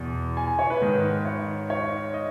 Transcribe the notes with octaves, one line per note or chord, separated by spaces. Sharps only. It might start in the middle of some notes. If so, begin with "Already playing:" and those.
Already playing: E2 B2
G#5
G#5
C#5
B4
G#2 D#3
C#5
C#5
D#5